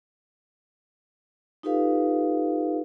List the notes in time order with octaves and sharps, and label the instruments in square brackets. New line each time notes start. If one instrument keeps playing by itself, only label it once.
[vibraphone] D#4 F4 G4 A4 B4 F5